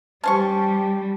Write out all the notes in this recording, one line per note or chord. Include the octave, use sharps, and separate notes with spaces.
G3 C#4 G4 C5 A5 C#6